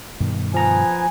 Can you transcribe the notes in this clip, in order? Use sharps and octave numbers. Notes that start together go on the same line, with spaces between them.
G2 B2 D#3
F3 B3 G#5 A#5